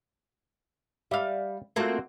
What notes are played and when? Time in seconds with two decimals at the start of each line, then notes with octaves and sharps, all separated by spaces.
1.11 G3 D5 E5 F5
1.76 A3 A#3 C4 F4 F#4